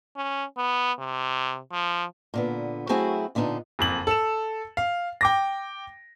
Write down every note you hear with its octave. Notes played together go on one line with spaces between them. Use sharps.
C#4
B3
C3
F3
A#2 D3 B3
F#3 A3 C4 E4 F#4 G#4
A#2 D3 B3 D4 D#4
F#1 F2 F#7
A4 E7
F5
G5 D6 A#6